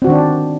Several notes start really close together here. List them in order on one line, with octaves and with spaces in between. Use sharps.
C4 F#4 D#3 D4